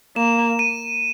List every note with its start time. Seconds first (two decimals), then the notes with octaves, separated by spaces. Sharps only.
0.16 A#3 E7
0.59 D#7